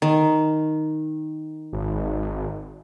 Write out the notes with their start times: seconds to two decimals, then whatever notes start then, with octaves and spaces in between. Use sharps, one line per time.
0.02 D#3
1.73 G#1